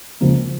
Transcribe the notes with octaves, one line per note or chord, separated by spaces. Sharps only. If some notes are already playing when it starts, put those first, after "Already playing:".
C#2 C#3 F3 A#3